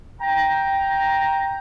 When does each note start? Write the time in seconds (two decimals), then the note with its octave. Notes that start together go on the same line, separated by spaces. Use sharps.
0.21 G5 A#5